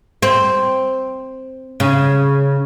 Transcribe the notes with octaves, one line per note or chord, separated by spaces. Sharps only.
C4
C#3